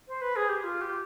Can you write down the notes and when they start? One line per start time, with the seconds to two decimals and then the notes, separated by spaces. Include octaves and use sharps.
0.08 C5
0.21 B4
0.36 G#4
0.49 G4
0.63 F4
0.81 G4